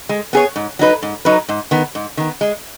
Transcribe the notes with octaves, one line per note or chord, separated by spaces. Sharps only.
G#3
B3 G#4 C#5
G#2
F#3 D#4 B4
G#2
F#3 D#4 B4
G#2
D#3 B3
G#2
D#3 B3
G#3